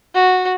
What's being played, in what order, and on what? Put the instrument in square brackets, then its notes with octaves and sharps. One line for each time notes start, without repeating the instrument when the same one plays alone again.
[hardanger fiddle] F#4